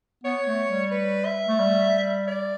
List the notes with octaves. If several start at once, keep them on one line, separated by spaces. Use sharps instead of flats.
B3 C#5
A3
G3
B4
E5
A3
G3
D5